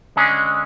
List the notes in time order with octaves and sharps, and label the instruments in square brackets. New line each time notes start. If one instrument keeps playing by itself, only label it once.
[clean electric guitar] D3 G#3 C#4 G#4